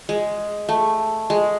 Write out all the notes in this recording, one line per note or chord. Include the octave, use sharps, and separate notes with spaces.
G#3
A3
G#3